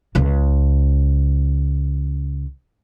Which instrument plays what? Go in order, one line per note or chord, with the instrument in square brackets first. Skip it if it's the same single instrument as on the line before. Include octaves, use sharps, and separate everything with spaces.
[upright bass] C#2 C#3